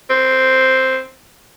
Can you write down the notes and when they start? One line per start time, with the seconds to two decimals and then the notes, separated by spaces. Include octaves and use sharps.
0.10 C4